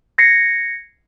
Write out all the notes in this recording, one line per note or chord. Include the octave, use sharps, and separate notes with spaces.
G#6 A#6 C7 C#7